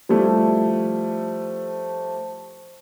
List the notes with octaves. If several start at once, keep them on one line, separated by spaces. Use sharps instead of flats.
F3 G3 A3 E4